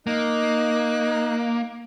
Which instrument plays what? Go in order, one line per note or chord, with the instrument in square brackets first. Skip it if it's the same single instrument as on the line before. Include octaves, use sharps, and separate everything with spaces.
[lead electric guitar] A#3 [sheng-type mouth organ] D#4 F#6